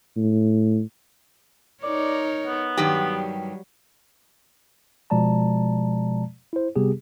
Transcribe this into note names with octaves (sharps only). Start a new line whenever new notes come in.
A2
D#4 A#4 C#5 D5
B3
G2 D#3 F#3 G3 G4
B2 F3 G#3 D5 A5 A#5
E4 C5
C3 G3 B3 G4 G#4